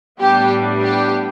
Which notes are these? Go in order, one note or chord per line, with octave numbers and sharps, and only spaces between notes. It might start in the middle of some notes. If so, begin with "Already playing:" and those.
A2 G3 B3 D4 G4
G4